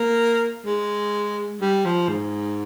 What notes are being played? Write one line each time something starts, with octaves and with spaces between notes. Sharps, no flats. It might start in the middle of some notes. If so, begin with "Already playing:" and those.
Already playing: A#3
G#3
G3
F3
G#2